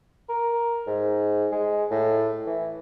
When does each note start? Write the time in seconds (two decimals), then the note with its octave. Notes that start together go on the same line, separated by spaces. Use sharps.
0.29 A#4
0.87 G#2
1.52 G#3
1.91 A2
2.47 E3